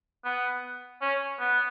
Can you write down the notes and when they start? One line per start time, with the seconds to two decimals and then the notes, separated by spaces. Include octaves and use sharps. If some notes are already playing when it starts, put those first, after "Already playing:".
0.25 B3
1.02 C#4
1.39 B3